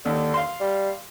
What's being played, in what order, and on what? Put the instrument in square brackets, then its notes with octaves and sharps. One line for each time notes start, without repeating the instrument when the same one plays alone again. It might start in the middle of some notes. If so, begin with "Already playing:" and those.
[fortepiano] D#2 [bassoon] D3
[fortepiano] F5 C6
[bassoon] G3